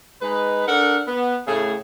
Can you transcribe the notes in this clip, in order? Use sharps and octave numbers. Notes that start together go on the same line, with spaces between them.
G#3 D#4 B4
D4 A4 A#4 F#5
B3
A2 C#3 A3 G#4